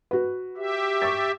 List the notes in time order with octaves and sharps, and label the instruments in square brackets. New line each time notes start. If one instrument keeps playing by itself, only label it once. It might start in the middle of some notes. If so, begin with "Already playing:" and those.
[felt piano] F#4 B4
[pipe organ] G4 E5
[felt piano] C#6 E6 A6